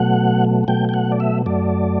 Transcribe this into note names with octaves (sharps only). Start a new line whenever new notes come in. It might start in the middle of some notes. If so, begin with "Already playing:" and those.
Already playing: B2 F#3 A3 F#5
B2 F#3 A3 G5
G5
F#5
D5
E5
F#2 F#3 A3 D5